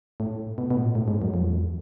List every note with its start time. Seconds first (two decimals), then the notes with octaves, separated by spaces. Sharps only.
0.20 A2
0.58 B2
0.70 B2
0.76 A2
0.83 A#2
0.95 A2
1.08 G#2
1.22 F#2
1.34 F2
1.43 E2
1.52 F2